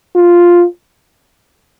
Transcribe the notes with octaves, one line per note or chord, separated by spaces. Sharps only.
F4